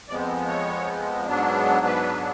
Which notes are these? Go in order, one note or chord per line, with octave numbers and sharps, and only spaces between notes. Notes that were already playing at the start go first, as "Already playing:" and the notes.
F2 F3 G#3 B3 D5
C#5
G#2 F#3 B3 D4
B4